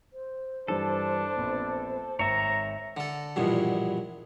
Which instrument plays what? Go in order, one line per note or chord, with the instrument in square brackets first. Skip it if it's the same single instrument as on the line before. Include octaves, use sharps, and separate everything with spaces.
[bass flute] C5
[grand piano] G2 E3 G3 [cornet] D4 [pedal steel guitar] A4
[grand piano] A#1 B3 C4
[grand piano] G#1 [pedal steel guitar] C#5 E5 [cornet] A#5
[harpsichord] D3 A4
A#1 E2 G2 B2